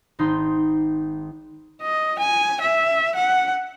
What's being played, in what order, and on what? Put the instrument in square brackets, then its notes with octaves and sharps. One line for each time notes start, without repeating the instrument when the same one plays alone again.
[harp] G#1 D#4 C6
[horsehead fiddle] D#5
G#5
E5
F#5